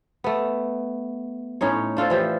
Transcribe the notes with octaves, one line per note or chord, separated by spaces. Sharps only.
A3 B3
A2 C#4 D#4 C#5
D4 F4 A4 C5
E3 F3 G4